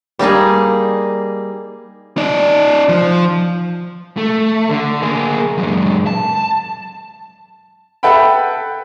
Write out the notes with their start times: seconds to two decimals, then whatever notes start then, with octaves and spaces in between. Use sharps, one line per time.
0.19 G3 A#3 D#4 G#4
2.17 D#4 D5
2.89 F3
4.17 A3
4.69 D3
5.03 A#3 G#4
5.58 F#2 G#3
6.07 A5
8.03 A4 B4 E5 F#5 G5 B5